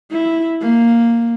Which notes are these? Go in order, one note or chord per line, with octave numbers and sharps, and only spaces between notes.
E4
A#3